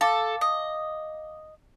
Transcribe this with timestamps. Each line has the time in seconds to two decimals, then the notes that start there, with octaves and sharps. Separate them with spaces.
0.01 A4 F5 D6
0.41 D#5